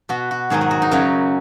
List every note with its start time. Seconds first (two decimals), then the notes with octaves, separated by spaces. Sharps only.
0.09 B2 B3 F#4
0.31 F#4
0.50 G#2 D#3 F#3 G#4
0.61 G#4
0.71 F#4
0.82 D#4
0.91 F#2 C#3 F#3 C#4 C#5